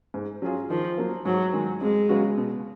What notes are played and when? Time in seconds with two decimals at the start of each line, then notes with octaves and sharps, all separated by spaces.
0.14 G#2
0.42 F#3 C#4 F4 G#4
0.70 D#3 F3
0.98 F#3 A#3
1.25 G#2 F#3
1.53 D#3 G#3
1.81 F2 G#3
2.09 C#3 F#3 B3 F#4
2.37 B2